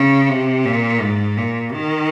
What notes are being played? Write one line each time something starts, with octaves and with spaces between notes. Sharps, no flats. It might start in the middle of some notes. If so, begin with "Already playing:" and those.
Already playing: C#3
C3
A#2
G#2
A#2
D#3